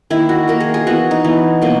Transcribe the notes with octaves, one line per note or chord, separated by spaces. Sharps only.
D#3 A#3 E4
F#4
D#3 A#3 A#4
G#4
G#4
E3 B3 F#4
D#4
E3 B3
B2 F#3 A#3